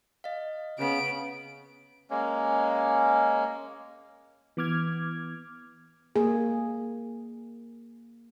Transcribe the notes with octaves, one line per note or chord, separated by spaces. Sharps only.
D#5 F5
C#3 B3 C#4 B6 D7
G#3 A#3 C#4
E3 B3 D6 F6 G#6
A#3 G#4